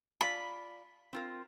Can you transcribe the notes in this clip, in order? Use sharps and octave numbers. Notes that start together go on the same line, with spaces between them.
F4 D5 B5
C4 F4 A#4